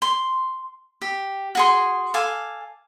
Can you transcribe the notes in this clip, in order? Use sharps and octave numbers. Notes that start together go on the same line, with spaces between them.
C6
G4
F#4 G#4 C6
A4 F5 G#5 D6